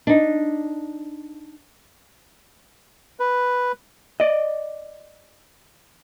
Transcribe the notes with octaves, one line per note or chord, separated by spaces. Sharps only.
D4 D#4
B4
D5 D#5